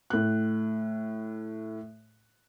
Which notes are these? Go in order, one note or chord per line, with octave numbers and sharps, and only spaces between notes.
A2 F#6